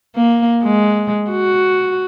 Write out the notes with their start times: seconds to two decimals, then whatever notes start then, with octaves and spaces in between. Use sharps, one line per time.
0.16 A#3
0.63 G#3
1.30 F#4